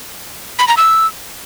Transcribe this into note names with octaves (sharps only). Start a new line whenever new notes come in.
B5
A#5
E6